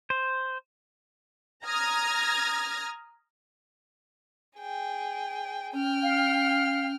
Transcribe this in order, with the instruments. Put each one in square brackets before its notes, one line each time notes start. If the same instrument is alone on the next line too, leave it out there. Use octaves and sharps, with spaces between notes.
[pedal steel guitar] C5
[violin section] A#5 D#6 F6 G#6 A#6
[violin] G#4 G5
[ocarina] C#4 [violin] G5 F6
[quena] F5